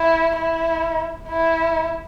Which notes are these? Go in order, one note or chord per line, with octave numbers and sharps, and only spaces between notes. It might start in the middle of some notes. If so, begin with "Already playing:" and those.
Already playing: E4
E4
E4